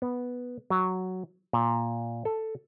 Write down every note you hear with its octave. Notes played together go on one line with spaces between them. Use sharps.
B3
F#3
A#2
A4